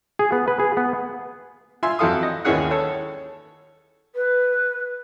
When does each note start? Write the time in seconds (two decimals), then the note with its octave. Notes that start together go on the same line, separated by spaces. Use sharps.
0.19 G#4
0.32 B3
0.48 B4
0.59 G#4
0.77 B3
1.83 F4 E5 G#5 C6
1.99 F2 F#3 E4 A4 F5 D#6
2.23 D#5
2.45 D#2 D#3 E3 C#4 G#4 F#5
2.71 A4 C#5
4.15 B4